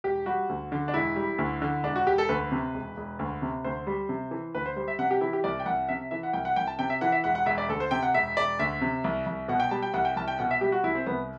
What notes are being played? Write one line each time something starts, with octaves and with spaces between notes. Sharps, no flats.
E1 G4
G3 F#4
D2
D3
D4
E1 E4
G3
D2
D3
E1 D4
F#4
E1 G4
A4
D2 B4
C3
E1
E1
D2
C3
D2 C5
G3
C3
E3
D2 B4
C5
G3 C5
E5
C3 F#5
G4
E3 E4
G4
C2 D5
G5
C2 F#5
C3 E5
E3 E5
F#5
C2 G5
F#5
C2 G5
A5
C3 G5
E5
E3 F#5
E5
E1 F#5
F#5
E1 E5
D5
D2 A4
C5
C3 G5
F#5
E1 E5
E1 D5
D2 E5
C3
C2
C2
B2 F#5
G5
G3 A5
G5
C2 F#5
G5
C2 A5
G5
B2 F#5
E5
G3 G4
F#4
C2 E4
C4
C2 B3